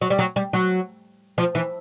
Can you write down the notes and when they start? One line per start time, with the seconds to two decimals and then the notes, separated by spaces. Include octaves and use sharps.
0.01 F#3
0.10 G3
0.19 F#3
0.36 G3
0.53 F#3
1.38 F3
1.55 E3